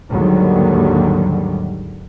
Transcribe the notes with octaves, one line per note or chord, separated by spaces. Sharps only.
D#2 G#2 D3 D#3 F#3 G3